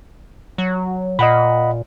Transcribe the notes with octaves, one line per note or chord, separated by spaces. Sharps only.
F#3
A#2 D#5 F#5 B5